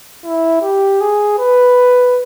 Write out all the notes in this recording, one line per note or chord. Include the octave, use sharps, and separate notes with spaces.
E4
G4
G#4
B4